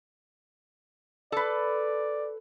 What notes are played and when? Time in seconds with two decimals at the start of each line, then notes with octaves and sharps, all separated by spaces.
1.32 A4 B4 D5